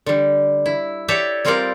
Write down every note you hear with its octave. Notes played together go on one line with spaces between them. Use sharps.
D3 G3
E4
G4 A4 C#5 D5 E5 A5
G3 C4 F4 A4 A#4 D5